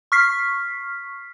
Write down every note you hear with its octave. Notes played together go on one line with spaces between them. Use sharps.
C#6 F6 B6 C7